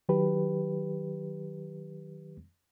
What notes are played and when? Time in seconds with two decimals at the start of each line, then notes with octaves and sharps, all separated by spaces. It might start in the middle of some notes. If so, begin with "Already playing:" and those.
0.09 D#3 F#3 G4 B4